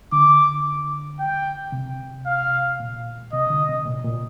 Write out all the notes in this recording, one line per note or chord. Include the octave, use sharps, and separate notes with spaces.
D3 D6
G5
C3
F5
A#2
C3 D#5
D3
C3
A#2
A#2